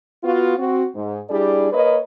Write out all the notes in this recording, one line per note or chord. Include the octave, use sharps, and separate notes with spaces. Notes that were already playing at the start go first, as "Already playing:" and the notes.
B3 F4 F#4
C4 F#4
G#2
G3 D4 E4 G4 G#4 D5
A#3 A#4 B4 C#5 D#5